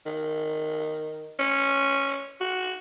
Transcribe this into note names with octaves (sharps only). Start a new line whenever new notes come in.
D#3
C#4
F#4